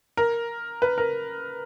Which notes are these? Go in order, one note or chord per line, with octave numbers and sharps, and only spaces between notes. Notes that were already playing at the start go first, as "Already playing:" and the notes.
A#4
B4
A#4